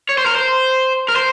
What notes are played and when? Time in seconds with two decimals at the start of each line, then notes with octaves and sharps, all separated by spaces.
0.09 C#5
0.18 C5
0.26 A#4
0.35 C5
1.08 A#4
1.16 C5